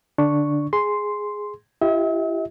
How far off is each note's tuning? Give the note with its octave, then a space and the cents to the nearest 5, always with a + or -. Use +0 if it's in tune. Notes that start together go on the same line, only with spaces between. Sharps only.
D3 +0 D4 +0 C#6 +0
G#4 +0 C6 +0
E4 +40 G4 +0 E5 -45